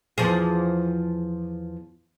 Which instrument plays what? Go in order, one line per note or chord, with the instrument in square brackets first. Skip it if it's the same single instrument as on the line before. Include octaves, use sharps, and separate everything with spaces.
[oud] E2 F3 G#4